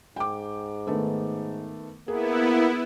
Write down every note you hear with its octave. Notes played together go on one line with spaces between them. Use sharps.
G#2 G5 D6
D#3 A3 B3
A#3 B3 E4 G#4